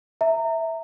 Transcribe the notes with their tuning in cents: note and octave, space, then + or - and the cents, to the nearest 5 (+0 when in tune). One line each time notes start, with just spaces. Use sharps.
E5 -5 A#5 -25